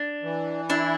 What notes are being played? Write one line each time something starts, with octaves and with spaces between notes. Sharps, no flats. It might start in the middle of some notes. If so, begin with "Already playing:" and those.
Already playing: D4
E3
D4 E4